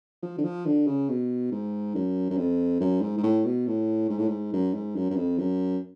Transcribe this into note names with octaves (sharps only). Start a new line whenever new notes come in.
F3
D3
F3
D3
C#3
B2
G#2
F#2
F#2
F2
F#2
G#2
G#2
A2
B2
A2
G#2
A2
G#2
F#2
G#2
F#2
F#2
F2
F#2